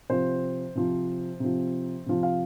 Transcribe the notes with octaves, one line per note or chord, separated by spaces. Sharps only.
C3 F3 C5
C3 F3
C3 F3
C3 F3
F5